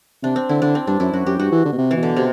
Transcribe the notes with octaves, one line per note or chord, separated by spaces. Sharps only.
C3 D4
C4
D3 E4
D3 D4
C4
G2 D4
F#2 E4
F#2 F#4
F#2 G4
G2 F#4
E3
D3
B2
C3
E3
B2
D3
C3